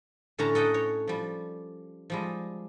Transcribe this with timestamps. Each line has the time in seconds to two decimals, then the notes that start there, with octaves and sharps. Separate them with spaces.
0.38 A2 D3 C#4 C#5 A5 A#5
0.55 A4 D#5 F#5 G5
0.74 C#5
1.08 F3 G3
2.10 F3 G3 G#3